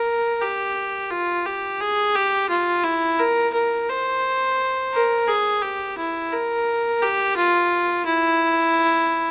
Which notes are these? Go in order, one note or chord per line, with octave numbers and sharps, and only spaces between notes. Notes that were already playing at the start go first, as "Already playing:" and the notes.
Already playing: A#4
G4
F4
G4
G#4
G4
F4
E4
A#4
A#4
C5
A#4
G#4
G4
E4
A#4
G4
F4
E4